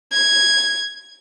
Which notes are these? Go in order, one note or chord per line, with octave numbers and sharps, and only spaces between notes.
G#6